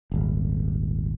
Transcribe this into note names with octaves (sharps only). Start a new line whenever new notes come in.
D#1 G#1